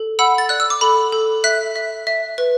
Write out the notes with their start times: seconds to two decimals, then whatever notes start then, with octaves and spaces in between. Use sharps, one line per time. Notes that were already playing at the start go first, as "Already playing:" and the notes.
Already playing: A4
0.19 F#5 B5 E6
0.38 A6
0.49 D5 F#6
0.60 E6
0.70 D6
0.81 A4 B5
1.12 A4
1.44 E5 F#6 B6
1.76 E5
2.07 E5
2.38 B4